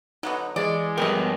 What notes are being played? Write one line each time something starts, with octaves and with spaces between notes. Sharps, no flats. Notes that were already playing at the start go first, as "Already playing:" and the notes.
D3 F#3 B3 D#4
E3 G#3 D5
G2 C#3 B3 G4 A#4 D#5